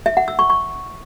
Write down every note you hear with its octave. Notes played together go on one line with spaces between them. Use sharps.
E5
F#5
E6
C#6
C#6